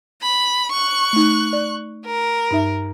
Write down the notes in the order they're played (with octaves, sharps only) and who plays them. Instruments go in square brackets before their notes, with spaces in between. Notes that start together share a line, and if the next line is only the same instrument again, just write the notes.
[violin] B5
C#6 F#6
[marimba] A3 D#4
D5
[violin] A#4
[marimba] G2 D#4 E5